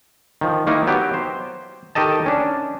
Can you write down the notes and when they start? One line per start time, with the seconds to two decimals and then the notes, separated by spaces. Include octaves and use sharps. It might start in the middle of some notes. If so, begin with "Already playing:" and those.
0.41 D#3 F3
0.67 D#3 A#3 D#4 E4
0.87 F#3 B3 G4
1.14 C5
1.95 D#3 G4 A4 D#5 A5
2.26 C#4 D4